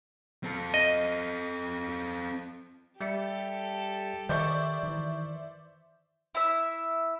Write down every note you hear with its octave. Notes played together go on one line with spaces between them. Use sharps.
C4 A4
D#5
G3 G4 A4 E5 C#7
D#3 C5 D5 E5 C#6 G6
D#3 E3
E4 E5